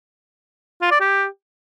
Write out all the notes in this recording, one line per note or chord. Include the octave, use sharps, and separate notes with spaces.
F4
D5
G4